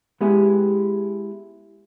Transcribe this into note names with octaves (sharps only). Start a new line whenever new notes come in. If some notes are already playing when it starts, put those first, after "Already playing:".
G#3 B3 E4 G4 G#4